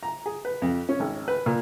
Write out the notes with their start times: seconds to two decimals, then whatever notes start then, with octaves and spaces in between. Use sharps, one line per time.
0.03 A#5
0.26 G#4
0.45 B4
0.62 F2
0.89 C#4
1.00 G#1
1.28 B4
1.46 A#2